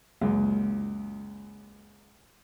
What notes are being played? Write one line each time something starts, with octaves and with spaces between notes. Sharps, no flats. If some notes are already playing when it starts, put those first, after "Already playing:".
C#2 F#2 A#2